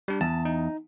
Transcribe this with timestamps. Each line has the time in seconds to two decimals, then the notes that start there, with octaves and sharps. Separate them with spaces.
0.08 G3 D4
0.21 E2 A5
0.45 D#4